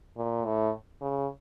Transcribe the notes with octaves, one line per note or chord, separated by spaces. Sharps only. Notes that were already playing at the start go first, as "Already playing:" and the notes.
A#2
A2
C#3